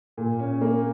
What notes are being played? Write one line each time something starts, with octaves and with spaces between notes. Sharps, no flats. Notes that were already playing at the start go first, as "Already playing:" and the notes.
A#2
C#4
A#3